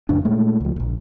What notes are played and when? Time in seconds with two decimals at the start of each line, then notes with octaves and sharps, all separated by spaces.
0.09 A1 F2 C#3 D4
0.25 A#2 G#3 A3
0.60 C#2 F3
0.76 D1 A#1